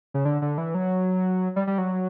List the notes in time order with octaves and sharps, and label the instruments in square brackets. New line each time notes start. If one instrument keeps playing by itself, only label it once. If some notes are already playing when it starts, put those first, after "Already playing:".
[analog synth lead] C#3
D3
D3
E3
F#3
G3
G3
F#3